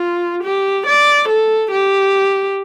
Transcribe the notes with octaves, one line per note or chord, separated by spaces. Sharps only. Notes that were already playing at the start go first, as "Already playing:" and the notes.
Already playing: F4
G4
D5
A4
G4